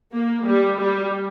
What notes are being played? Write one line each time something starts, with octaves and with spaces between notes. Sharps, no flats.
A#3
G3
G3